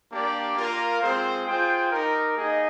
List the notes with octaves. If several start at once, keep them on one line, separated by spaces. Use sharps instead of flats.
A#3 D4 G4 D5
A#3 F4 A#4 F5
G#3 C4 F4 G#4 C5
F4 G#4 C5 G5
D#4 G4 A#4
A#3 D#4 G#4 D#5